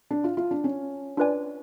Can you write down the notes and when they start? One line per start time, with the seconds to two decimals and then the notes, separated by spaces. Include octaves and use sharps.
0.11 D4
0.24 F4
0.37 F4
0.51 D4
0.64 C#4
1.17 D4 F4 B4 D5 G#5